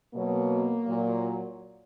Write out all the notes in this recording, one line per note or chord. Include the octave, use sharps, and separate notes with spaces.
B2 F#3 A#3
A#2 F#3